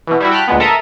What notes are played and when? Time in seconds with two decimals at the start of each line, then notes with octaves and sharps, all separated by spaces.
0.07 B2 E3
0.20 G3 E4 F#4
0.31 G5 A5 B5 F6 F#6
0.48 D2 A#2 G#3 B3
0.60 A4 A#4 E5 A5 A#5 D#6